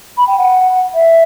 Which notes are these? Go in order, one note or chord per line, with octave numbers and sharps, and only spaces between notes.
B5
G5
F#5
E5